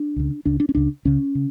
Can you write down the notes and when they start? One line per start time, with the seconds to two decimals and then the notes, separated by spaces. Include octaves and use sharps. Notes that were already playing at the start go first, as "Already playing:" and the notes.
Already playing: D4
0.16 C#2 C#3
0.45 C#2 C#3 D4
0.60 D4
0.69 C#4
0.75 C#2 C#3 D4
1.05 C#2 C#3 C#4
1.35 C#3